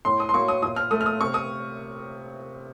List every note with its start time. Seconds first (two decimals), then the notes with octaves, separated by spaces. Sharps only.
0.05 A2 C6
0.20 D#6
0.29 C6
0.34 F#3 A#3 C#6
0.48 D#6
0.62 A#2 D#6
0.76 F6
0.91 A3 D#6
1.01 F6
1.06 D#6
1.21 C3 C#6
1.34 D#6